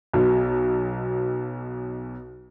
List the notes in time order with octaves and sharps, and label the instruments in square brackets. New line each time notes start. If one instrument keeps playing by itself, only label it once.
[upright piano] B1 B2